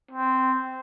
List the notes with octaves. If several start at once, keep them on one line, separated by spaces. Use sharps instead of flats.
C4